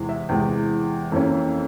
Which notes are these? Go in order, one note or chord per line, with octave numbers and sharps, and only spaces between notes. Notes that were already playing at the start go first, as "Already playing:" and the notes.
Already playing: E2 C3 E3 G#3
E5
E2 C3 E3 G#3 G5
F2 E3 A#3 C#4